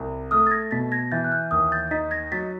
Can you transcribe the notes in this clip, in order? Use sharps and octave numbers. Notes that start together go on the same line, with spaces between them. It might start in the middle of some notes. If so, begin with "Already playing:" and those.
Already playing: C2
A3 D#6 F6
A6
G#6 A#6
B2 A6 B6
G#6 A#6
E3 G6 A6
F#6
F6 G6
D#2 D#6 F6
G6 A6
D#4 A6 B6
G#6 A#6
F#3 A6 B6